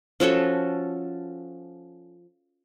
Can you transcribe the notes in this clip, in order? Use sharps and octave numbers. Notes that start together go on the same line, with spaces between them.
F3 C#4 F#4 A4